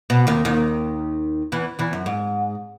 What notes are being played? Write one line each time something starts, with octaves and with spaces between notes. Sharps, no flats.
B2
D#2 D#3
D#2 D#3
E2 E3
E2 E3
F#2
G#2